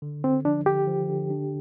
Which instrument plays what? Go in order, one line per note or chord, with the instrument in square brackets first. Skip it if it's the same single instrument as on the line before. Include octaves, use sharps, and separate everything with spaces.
[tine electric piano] D3
[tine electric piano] D3 [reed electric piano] C4
[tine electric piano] F3 [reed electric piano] D4
[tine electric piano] D3 [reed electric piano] G4
[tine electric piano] F3
D3
D4